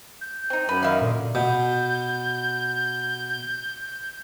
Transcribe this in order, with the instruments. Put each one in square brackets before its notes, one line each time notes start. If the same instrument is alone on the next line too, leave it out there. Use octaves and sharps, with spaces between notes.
[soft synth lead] G6
[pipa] C4 D#4
[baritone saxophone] F#2 [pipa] B4
[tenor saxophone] D#3 [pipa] E5 F5
[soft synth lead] A#2 [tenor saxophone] D3
[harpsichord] B2 [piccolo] G6